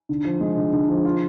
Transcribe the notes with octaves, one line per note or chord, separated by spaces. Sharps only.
D3
F3
G#3
D3
D3
F3
F4